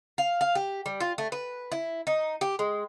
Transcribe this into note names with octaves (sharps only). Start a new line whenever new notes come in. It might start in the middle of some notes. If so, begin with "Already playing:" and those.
F5
F5
G4
G3
F4
A3
B4
E4
D#4
G4
G#3